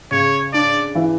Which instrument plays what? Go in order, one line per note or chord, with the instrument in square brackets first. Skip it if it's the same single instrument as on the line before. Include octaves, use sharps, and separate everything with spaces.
[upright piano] C#3 [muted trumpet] C#5
[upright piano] D4 [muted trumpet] D5
[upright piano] E3